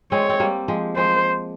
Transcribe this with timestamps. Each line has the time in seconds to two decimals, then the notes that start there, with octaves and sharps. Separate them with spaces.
0.12 G#3 C4 C#5
0.29 C4
0.40 G3 A#3
0.68 F3 G#3
0.96 F3 G#3 C5